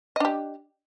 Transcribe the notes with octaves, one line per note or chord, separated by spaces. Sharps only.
D4 G4 D#5